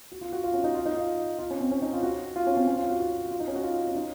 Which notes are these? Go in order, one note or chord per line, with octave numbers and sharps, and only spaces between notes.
F#4
F4
F#4
F4
C#4
D#4
F4
D#4
F4
F4
C#4
C4
C#4
D#4
F4
F#4
F4
C#4
C4
C#4
F4
F#4
F#4
F4
D#4
C#4
F#4
F4
C#4
D#4